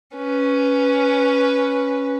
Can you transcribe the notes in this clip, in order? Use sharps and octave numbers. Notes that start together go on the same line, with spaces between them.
C#4 B4